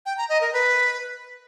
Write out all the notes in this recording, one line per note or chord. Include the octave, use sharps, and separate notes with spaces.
G5
A#5
D#5
A#4
B4